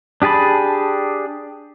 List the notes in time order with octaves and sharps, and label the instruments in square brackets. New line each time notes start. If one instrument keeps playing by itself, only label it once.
[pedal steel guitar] D4 G4 G#4 A5 B5